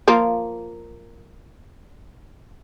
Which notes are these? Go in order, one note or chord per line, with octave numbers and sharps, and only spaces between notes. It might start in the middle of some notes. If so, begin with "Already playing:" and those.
F3 A#3 F4